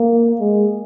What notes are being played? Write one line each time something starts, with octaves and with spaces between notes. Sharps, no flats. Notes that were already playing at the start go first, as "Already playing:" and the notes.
Already playing: A#3
G#3